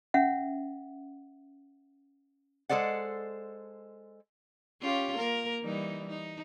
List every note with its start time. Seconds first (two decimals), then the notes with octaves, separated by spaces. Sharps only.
0.14 C#4 E5 F#5
2.69 G#3 A4 C5 D5 F#5
4.82 C#4 F4 G4
5.17 A#3 A#4
5.62 E3 G3 D#4
6.09 D#4